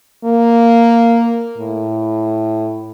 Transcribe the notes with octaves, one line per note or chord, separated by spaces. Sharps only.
A#3
A2